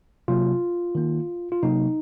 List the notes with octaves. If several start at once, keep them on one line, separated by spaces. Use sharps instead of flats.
C3 F#3 A#3 F4
D#3 A#3
F4
C3 F#3 A#3 D#4